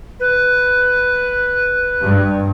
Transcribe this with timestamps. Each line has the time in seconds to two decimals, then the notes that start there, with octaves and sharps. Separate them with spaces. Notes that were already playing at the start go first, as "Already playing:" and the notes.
0.20 B4
2.01 G2